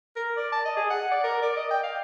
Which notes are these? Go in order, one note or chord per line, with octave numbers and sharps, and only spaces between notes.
A#4
D5
A5
D#5
G#4
F#5
D5
A#4
D5
D#5
G5
F5